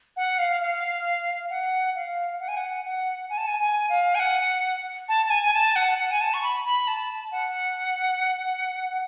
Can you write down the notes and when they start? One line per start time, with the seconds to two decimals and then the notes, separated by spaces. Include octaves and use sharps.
0.17 F#5
0.39 F5
0.61 F5
1.50 F#5
1.96 F5
2.40 F#5
2.48 G#5
2.57 F#5
2.85 F#5
3.30 G#5
3.38 A5
3.47 G#5
3.60 G#5
3.89 F5
4.15 G#5
4.19 F#5
5.09 A5
5.26 A5
5.30 G#5
5.43 G#5
5.54 A5
5.76 F#5
5.98 F#5
6.11 G#5
6.21 A5
6.34 C#6
6.43 B5
6.65 B5
6.88 A5
7.32 F#5